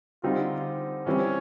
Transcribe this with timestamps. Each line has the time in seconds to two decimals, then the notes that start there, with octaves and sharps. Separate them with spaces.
0.23 D3 G3 C4 D#4 F4
1.07 E3 G3 C4 C#4 E4